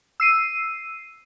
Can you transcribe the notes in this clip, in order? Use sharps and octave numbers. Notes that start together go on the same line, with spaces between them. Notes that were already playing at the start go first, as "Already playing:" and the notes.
E6 C7 D#7